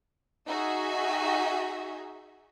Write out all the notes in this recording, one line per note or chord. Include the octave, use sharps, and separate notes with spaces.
D#4 F#4 G#4 E5